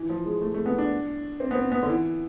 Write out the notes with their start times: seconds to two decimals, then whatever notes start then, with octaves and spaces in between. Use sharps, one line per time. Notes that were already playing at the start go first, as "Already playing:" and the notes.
Already playing: E3
0.10 F3
0.26 G#3
0.41 A3
0.54 A3
0.66 B3
0.78 D4
1.40 C4
1.51 B3
1.55 C4
1.72 B3
1.83 D3
1.89 E3